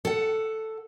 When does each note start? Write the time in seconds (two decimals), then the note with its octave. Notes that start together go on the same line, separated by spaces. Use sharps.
0.05 A4 F#5